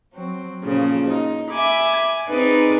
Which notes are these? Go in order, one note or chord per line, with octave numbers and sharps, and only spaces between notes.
F#3 C4
A#2 C#3 F3
D#4
E5 G#5 B5 D6
C4 D#4 G#4 B4 D5 G#5